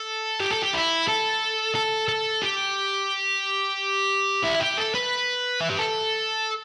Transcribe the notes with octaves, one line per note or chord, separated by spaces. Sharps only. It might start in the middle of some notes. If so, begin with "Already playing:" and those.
Already playing: A4
G4
A4
G4
E4
A4
A4
A4
G4
E4
G4
A4
B4
E4
G4
A4